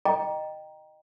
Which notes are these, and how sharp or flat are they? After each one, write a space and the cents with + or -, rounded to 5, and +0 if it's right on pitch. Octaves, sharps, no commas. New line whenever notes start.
D#5 -15 G5 +0 A#5 +15